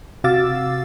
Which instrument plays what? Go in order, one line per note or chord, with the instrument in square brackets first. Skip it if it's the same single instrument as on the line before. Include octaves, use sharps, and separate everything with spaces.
[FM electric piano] C3 F#4 F5 D6 E6 A6